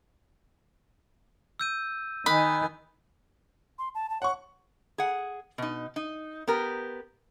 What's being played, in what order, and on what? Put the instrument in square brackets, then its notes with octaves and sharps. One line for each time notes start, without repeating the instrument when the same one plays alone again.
[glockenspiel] E6 G6 D#7
[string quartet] D#3 D#4 G#5 [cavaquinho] B5 [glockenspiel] D#6 F#6
[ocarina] C6
A5
A5
[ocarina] C#5 [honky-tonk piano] F#5 C#6
[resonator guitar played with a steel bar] G#4 F#5
B2 D#4
D#4
B3 G4 A#4